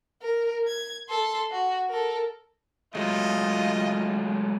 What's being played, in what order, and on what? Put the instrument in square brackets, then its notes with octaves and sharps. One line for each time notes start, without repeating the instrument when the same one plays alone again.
[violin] A#4
G#6
A4 C6
F#4
A4 A#4
[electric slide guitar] F#3 G#3 A3 [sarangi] F4 [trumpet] D#5